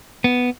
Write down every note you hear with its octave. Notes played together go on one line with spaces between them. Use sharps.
B3